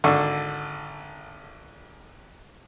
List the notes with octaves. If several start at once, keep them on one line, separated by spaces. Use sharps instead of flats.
G#1 D3 D4 A4 C#6